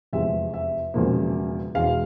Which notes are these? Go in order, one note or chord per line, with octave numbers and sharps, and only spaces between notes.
F1 E2 C3 F3 G#3 E5
E5
E1 E2 C#3 F3 A#3
E1 E2 E3 G#3 F5